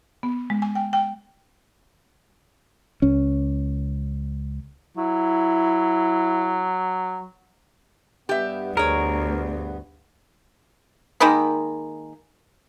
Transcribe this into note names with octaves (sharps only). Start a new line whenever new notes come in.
B3
G#3
G#5
G5
G5
C#2 C#4
F#3 E4
G2 B3 G4 E5
D2 G#4 A#4 C#5
D#3 G#3 A#3 B5